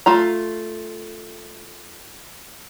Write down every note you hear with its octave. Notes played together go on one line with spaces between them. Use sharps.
A3 F4 A#5